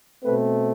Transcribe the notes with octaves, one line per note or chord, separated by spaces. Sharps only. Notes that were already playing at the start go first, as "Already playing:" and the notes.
B2 A3 C4 B4